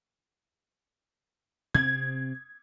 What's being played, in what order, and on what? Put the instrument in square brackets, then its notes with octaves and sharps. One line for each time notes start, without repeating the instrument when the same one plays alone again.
[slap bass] C3 C4 [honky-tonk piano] G#6